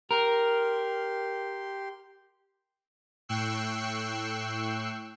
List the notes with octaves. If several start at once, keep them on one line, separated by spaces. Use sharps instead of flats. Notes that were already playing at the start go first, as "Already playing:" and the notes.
G4 A#4 C6
A2 G5 C#6 E6 F#6 C7